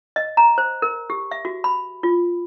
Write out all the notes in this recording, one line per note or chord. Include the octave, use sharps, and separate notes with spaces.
D#5
A#5
C5
A#4
G4
E5
F#4
B5
F4